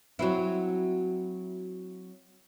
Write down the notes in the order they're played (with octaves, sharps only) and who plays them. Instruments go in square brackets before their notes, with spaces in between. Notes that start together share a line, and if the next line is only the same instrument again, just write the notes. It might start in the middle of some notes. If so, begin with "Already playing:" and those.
[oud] F#3 C4 E4